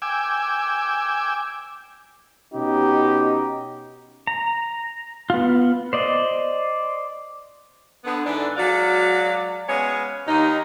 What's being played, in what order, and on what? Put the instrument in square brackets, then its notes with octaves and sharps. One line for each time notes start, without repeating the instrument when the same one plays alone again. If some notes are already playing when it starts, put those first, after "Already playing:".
[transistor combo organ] G5 G#5 D6 E6
[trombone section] B2 C#4 D#4 G4
[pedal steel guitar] A#5
B3 F4
C5 D5 D#5
[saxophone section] D3 B3
G#2 E3 D4 A4 D5
F#3 G#3 F#4 D5 F5
G#3 B3 C#4 C#5 F5
D#2 D#4